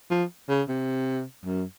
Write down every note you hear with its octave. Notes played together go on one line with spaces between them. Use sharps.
F3
C#3
C3
F#2